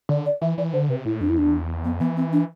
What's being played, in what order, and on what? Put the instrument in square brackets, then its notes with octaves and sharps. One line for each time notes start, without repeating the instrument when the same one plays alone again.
[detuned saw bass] D3 [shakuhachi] D5
[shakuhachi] D5
[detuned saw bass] E3 [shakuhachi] E5
[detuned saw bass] E3 [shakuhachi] D5
[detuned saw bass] D3 [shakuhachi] C5
[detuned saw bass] C3 [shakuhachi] B4
[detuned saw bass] A2 [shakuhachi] E4
[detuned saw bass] F2 [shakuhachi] D4
[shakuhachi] E4
[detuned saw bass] E2 [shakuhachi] D4
[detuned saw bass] F2 [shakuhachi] B3
[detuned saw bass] E3 [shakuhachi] B3
[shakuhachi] C4
D4